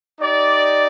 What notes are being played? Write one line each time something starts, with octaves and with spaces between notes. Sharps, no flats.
D#4 G4 D5